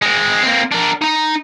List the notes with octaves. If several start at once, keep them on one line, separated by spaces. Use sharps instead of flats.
G#3 C4
A#3 C4
D4 A#4
D#4 A#5